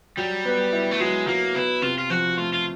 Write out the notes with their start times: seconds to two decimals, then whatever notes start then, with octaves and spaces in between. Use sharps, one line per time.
0.17 F#3 G3
0.45 B3
0.72 E4
0.91 A3
1.00 F#3 G#3
1.27 F#3 A#3
1.55 B3 E4
1.82 C3 F4
1.98 F4
2.10 F3 F#4
2.37 A3 F4
2.53 F4